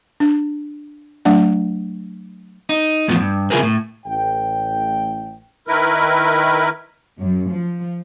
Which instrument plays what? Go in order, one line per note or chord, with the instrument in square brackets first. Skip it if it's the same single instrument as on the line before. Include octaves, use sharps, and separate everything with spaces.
[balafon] D4
F#3 A3 D4 F#5
[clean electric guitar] D#4
E2 A2 F3 B3
G2
C#3 E4 F4 G#4 A#4 B4
A2
[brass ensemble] A1 G5
[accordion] D#3 E4 A#4 B4
[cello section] F#2
F3